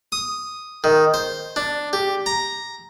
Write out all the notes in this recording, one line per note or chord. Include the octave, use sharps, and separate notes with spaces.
D#6
D#3
C5
D4
G4
A#5